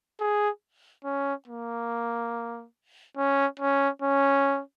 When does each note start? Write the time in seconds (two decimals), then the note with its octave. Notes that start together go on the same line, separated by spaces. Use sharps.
0.20 G#4
1.05 C#4
1.48 A#3
3.17 C#4
3.59 C#4
4.02 C#4